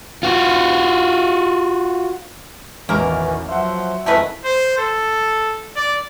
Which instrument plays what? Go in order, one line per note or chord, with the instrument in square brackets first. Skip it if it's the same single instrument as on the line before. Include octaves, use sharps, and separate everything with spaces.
[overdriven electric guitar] F4 F#4
[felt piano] A1 E2 [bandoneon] B2 E3 C#4 [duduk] D#3 [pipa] A#3 A#4
[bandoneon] F3 C5 [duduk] F#3 [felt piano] E5 F#5
[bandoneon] F2 D#3 G#3 [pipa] A3 A#4 B4 [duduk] E4
[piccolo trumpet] C5
A4
D5